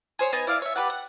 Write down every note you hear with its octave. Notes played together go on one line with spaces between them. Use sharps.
G#4 C5 C#5
B3 D#4 G#5
E4 D5 F5
C#5 E5
G4 B4 D5 F#5
F#5